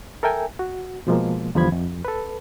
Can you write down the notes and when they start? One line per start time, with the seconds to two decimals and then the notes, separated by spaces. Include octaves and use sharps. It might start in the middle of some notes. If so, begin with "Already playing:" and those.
0.23 A4 A#4 E5 G5 G#5
0.59 F#4
1.07 B2 F3 G#3 A#3
1.55 E2 D3 F3 G3 B5 G#6
1.72 F2
2.05 A4 B4